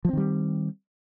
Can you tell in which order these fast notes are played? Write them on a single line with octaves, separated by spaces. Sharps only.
F3 C4 D#3 G3